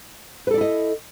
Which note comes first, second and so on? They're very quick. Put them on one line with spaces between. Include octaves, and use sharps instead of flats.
B4 A4 D5 E4 D#5